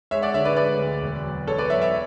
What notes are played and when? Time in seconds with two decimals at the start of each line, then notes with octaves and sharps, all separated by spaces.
0.11 G#3 C#5 E5
0.22 D5 F#5
0.34 D3 C#5 E5
0.45 B4 D5
0.57 G#3 B4 D5
0.79 D2
1.02 E1
1.25 F#3
1.47 E1 A4 C#5
1.58 B4 D5
1.70 F#3 C#5 E5
1.81 C#5 E5